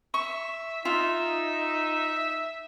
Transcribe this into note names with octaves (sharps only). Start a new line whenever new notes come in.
E5 C#6
D#4 F4 E5